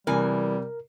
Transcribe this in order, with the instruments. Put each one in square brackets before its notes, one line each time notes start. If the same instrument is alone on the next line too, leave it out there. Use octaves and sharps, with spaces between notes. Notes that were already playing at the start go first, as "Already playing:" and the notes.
[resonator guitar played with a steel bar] E2 E3 G#5 [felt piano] C3 [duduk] G3 [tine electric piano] A#4